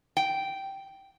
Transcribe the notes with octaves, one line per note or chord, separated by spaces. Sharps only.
G5